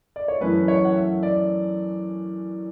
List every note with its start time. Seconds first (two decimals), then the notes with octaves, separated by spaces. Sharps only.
0.16 D5
0.28 C#5
0.41 F#2 E3 A3 C#4 B4
0.68 C#5
0.85 F#5
0.96 E5
1.23 D5